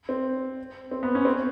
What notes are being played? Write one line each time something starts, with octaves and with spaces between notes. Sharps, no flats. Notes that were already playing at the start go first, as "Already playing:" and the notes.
C4
C4
B3
C#4
C4